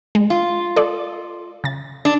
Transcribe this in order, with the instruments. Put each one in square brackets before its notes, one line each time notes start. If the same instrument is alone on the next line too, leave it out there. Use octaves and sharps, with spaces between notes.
[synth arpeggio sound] G#3
[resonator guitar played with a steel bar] F4
[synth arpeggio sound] A4 D5
C#3 A6
[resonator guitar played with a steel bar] D4